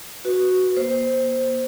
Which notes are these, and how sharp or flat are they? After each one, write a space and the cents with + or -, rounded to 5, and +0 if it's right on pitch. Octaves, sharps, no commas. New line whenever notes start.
F#4 +0 B4 +0
A#3 +40 C5 +0